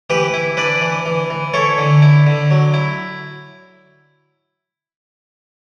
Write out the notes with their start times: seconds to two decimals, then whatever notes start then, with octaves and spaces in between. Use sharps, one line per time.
0.10 E3 G4 B4
0.34 E4
0.57 D4 B4 D5
0.81 E3
1.06 E3
1.30 E3
1.54 E4 A4 C#5
1.78 D3
2.02 E4
2.27 D3
2.51 F#3
2.74 E4